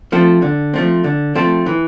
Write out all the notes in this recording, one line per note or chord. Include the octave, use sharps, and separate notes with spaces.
F3 A3 C4
D3
F3 A3 C4
D3
F3 A3 C4
E3